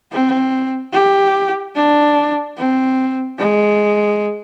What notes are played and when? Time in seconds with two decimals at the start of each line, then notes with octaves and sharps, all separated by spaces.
0.12 C4
0.93 G4
1.75 D4
2.57 C4
3.38 G#3